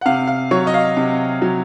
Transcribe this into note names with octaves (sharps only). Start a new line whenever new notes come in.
F#5
C3 F5
F5
F#3 C#5
D#5
F5
C3
F#3